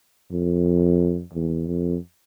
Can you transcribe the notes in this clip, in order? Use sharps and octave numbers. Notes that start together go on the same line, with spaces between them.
F2
E2
F2